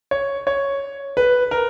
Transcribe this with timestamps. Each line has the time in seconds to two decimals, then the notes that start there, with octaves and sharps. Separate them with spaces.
0.11 C#5
0.47 C#5
1.17 B4
1.51 A#4